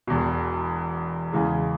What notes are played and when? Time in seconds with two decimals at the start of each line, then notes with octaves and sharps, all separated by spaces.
0.07 E1 E2 B2
1.33 E2 C#3 E3 G#3